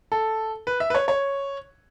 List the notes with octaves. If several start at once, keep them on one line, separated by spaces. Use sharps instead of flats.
A4
B4
E5
B4
C#5
C#5